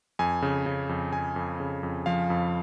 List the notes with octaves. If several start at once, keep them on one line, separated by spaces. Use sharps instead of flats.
F2 G#5
C#3
C#3
F2
F2 G#5
F2
C#3
F2
F3 F5
F2